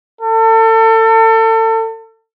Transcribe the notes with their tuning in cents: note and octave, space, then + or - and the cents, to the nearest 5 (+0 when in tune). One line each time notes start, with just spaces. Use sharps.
A4 +30